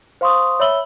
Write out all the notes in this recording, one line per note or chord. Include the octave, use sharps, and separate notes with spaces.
C5 F5 C6 C#6 D#6
C#5 E5 B5 E6 F#7 G7